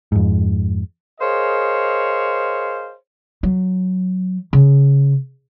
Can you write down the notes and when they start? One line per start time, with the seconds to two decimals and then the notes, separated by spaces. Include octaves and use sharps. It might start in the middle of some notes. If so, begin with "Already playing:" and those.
0.12 F2 G#2
1.20 G#4 A#4 C5 C#5 D#5 F5
3.43 F#3
4.53 C#3